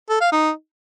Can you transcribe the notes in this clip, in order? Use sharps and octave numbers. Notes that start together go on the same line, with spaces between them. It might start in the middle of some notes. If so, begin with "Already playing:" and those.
A4
F5
D#4